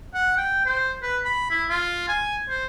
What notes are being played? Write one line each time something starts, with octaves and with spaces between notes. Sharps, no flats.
F#5
G5
C5
B4
B5
E4
F4
G#5
C5